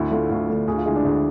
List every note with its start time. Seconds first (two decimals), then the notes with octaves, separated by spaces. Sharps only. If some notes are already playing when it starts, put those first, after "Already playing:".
Already playing: D2 E4
0.11 D3 A3 F4
0.30 D2 F4
0.49 D3 A3
0.68 D2 G#4
0.77 F4
0.86 D3 G#3 E4
0.96 D4
1.04 D2 G#4